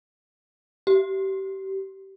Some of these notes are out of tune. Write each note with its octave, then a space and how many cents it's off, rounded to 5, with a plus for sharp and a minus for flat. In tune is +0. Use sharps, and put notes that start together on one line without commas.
G4 -25